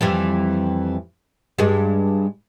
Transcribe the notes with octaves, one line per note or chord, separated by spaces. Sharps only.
F2 E3 G3
G2 G#3